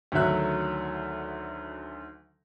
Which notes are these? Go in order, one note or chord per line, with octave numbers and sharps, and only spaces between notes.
D2 D3 D#3 F#3 E5 F#6